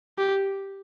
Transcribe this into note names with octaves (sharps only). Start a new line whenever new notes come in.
G4